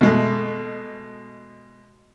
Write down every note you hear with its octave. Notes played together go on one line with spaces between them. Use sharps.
B2 G#3 A3